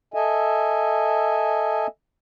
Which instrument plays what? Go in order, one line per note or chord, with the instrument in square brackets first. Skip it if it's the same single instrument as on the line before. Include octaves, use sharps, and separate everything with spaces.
[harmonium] A4 D#5 E5 G#5